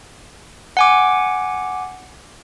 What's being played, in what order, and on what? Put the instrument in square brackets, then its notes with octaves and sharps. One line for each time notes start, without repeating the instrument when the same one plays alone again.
[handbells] F#5 G#5 D6